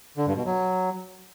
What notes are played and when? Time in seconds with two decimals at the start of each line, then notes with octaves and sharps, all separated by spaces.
0.17 D3
0.27 G2
0.36 B2
0.45 F#3